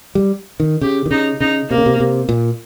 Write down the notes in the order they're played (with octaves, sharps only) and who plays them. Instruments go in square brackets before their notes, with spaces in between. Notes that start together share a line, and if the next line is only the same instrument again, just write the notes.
[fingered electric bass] G3
D#3
[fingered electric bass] C#3 [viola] G4
[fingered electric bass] D#3
[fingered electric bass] C#3 [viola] D#4
[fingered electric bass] C#3 [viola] D#4
[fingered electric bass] C3 [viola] A#3
[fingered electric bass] C#3
C3
C3
A#2